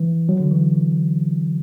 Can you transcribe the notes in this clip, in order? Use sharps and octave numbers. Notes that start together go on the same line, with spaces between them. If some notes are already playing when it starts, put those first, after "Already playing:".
Already playing: E3
F#3
D3
E3